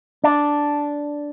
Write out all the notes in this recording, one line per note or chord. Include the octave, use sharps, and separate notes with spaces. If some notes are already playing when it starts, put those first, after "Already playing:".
D4